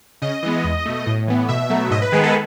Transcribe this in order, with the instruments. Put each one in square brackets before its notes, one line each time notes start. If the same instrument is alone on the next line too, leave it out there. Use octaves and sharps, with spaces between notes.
[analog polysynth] C#3 D#5
E3 G#3 B3
E2
B2 A3
A2
E3 B3
B2 E5
F#3 A3
G#2 D#5
B4
D#3 G#3 B3 G#4
A4